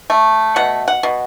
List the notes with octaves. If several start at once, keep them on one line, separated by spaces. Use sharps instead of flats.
A3
B2 F#5
F#5
B2